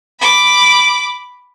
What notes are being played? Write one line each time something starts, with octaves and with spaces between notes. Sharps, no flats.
B5 D6